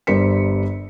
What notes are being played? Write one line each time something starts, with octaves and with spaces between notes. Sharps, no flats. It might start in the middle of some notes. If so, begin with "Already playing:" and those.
G1 G3 C5 B6 C#7